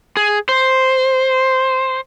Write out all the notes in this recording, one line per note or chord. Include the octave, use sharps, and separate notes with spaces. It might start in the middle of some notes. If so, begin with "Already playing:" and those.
G#4
C5